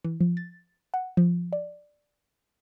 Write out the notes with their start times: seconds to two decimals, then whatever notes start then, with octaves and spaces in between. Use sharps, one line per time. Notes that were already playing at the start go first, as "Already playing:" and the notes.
0.04 E3
0.21 F3
0.37 A6
0.94 F#5
1.17 F3
1.53 D5